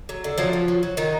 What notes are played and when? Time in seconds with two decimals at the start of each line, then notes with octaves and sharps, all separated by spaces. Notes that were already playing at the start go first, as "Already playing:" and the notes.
0.09 F#3
0.24 D3
0.38 F3 F#3 F4
0.53 F#3
0.68 F#3
0.83 F#3
0.97 D#3 F#3 D#4